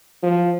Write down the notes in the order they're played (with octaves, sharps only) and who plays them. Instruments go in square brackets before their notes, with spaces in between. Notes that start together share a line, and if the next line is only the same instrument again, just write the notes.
[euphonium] F3